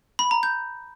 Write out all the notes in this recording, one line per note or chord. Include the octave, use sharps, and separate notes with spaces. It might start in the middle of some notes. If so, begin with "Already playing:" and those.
B5
A#5
G6